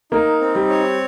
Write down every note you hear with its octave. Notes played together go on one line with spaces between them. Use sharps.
A#3 D#4
C4
G3
C#5